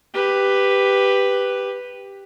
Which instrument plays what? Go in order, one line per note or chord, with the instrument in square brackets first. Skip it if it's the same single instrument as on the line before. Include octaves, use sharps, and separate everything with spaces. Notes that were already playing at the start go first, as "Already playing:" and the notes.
[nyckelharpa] G4 B4